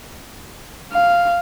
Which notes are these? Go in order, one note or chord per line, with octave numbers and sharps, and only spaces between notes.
F5